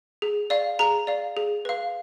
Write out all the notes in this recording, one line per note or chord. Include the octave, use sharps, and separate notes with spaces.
G#4
D5 F5
G#4 A#5
D5 F5
G#4
B4 F5